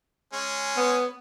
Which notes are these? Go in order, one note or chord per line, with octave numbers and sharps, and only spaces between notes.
G#3 C#4
B3